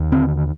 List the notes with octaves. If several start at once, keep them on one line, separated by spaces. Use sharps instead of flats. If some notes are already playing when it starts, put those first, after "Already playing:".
Already playing: D#2
D3 C4